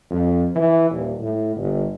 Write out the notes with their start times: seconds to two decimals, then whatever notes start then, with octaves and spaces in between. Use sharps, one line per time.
0.11 F2
0.55 E3
0.91 D#1
1.20 A2
1.57 G1